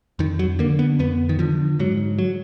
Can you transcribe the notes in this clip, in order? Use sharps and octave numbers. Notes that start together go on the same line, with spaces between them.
F2 D#3
F#3
D3 A#3
B3
F2 B3
D#3
D3 F3
G#2 F#3
F#3